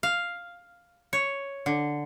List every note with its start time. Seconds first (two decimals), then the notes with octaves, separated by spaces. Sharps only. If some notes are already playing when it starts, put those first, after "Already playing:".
0.03 F5
1.13 C#5
1.66 D3